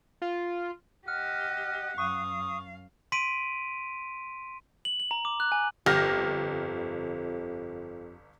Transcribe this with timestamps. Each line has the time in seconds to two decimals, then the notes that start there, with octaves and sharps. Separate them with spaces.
0.22 F4
1.08 G4 D#5 F#5 F6
1.98 F#2 F5 C#6 D#6
3.12 C6 B6 D7 D#7
4.85 F#7
5.00 F#7
5.11 A#5
5.25 D6
5.40 F#6
5.52 G#5
5.86 G1 F2 G4 F6 A#6